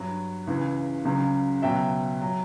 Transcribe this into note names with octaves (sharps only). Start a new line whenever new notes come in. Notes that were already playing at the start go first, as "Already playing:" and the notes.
Already playing: G2 F#3
C#2 C#3 E3
C#2 C#3 F#3
C#2 B2 F#3 E5 G5
F#3